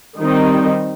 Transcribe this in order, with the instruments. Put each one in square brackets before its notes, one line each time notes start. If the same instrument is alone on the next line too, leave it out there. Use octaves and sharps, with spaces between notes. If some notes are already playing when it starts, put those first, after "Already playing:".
[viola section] D#3 G3 C4 D#4